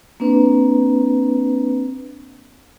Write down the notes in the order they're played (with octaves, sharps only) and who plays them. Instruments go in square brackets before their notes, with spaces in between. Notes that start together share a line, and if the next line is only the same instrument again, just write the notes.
[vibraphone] A#3 C4 D4 B4